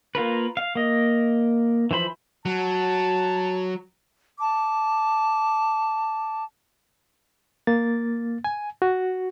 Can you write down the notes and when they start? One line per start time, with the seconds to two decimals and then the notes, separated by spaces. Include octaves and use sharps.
0.15 A#3 F4 A#4 B4
0.57 F5
0.75 A#3 D#5
1.91 E3 F3 C5 B5
2.46 F#3 A5
4.39 A5 D6
7.67 A#3 A6
8.44 G#5
8.82 F#4